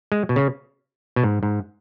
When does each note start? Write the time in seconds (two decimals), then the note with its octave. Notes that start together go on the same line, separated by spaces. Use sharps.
0.12 G#3
0.29 B2
0.36 C#3
1.16 B2
1.23 G#2
1.43 G#2